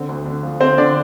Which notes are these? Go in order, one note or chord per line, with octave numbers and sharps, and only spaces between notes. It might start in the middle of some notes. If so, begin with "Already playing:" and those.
Already playing: D3 C4
D2
D3
F3
D3 C4 C5
D3 D4 D5